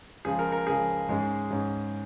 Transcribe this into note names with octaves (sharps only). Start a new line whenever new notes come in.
C#2 C#3 F3 G#4
A#4
A#4
C#2 C#3 F3 G#4
G#2 G#3 C#4
G#2 G#3 C#4